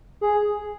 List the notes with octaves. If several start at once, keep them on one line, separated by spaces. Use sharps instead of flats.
G#4